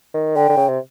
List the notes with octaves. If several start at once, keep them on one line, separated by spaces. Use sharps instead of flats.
D#3
D3 G5
D3
C#3
C3